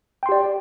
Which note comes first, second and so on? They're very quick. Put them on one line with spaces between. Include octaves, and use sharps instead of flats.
G5 C6 G4 D5